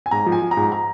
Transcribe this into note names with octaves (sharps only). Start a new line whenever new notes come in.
G#5
G#2 A#5
F3
G#5
F3
A#5
G#2
A#5